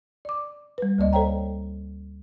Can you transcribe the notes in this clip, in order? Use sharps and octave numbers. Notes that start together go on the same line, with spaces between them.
D5 D6
G3 B4
D2 A#3 D5 D#5
A4 C5 C#5 F5 G5 A#5